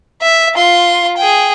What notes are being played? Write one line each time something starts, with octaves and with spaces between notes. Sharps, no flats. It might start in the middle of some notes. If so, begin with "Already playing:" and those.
E5
F4 C6
G#4 G5